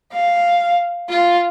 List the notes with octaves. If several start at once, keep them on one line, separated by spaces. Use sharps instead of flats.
F5
F4